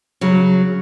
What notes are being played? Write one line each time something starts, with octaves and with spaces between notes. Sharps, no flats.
C#3 F#3